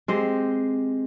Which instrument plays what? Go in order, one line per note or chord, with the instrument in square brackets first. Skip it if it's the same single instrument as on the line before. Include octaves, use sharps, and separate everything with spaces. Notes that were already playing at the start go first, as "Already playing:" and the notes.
[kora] G#3 C4 G4